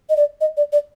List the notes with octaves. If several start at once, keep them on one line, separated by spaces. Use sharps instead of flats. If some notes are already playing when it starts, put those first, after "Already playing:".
D#5
D5
D#5
D5
D5